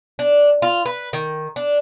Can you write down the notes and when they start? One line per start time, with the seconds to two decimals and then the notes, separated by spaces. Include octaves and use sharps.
0.19 D4
0.62 F4
0.86 B4
1.13 D#3
1.56 D4